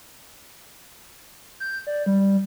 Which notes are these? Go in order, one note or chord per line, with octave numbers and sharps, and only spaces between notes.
G6
D5
G3